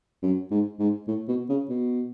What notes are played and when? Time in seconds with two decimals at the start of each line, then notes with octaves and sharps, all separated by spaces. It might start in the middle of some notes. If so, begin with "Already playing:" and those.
0.23 F#2
0.51 G#2
0.79 G#2
1.08 A2
1.28 B2
1.49 C#3
1.70 B2